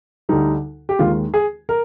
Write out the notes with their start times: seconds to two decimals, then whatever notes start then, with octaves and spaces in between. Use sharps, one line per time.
0.29 D2 D3 G3 D#4
0.89 G4
0.99 D#2 D#3 G#3 F4
1.34 G#4
1.69 A#4